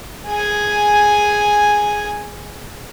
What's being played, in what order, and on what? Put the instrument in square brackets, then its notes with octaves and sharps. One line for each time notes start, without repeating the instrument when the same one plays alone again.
[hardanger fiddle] G#4 G#5